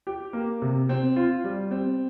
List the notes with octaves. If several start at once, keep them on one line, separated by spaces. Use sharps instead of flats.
G4
A#3
C3
C4
F4
G3
C4